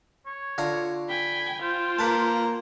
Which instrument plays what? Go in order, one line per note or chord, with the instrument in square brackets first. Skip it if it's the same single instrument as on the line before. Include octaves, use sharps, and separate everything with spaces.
[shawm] C#5
[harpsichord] D3 F4 A#5
[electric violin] G5 G#5 [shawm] B5
[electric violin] F4 C5 [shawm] G5
[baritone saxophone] A#3 [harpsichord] B4 A5